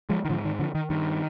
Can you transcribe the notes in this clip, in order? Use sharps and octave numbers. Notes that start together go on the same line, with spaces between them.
F3 G#3
D#3
G#2 D3 F3
D#3
D3 F3
D#3
G2 D#3